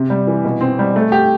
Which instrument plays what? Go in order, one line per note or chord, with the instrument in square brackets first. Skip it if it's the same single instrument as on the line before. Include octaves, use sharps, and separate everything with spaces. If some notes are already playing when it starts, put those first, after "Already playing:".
Already playing: [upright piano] C3
G3
E3
B2
C4
G3
A3
G4